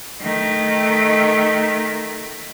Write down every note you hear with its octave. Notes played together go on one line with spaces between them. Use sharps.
D#3 A3